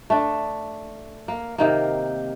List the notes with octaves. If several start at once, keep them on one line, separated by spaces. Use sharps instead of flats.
A3 D4
A#3
C3 D#3 A#3